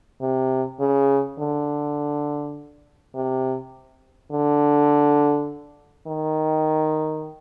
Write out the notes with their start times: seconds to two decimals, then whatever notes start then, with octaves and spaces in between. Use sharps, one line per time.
0.21 C3
0.80 C#3
1.39 D3
3.15 C3
4.32 D3
6.07 D#3